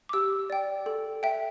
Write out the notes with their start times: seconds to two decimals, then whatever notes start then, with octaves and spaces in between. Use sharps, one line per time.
0.09 D6
0.13 G4 E6
0.50 D5 G5
0.86 A4
1.23 E5 G5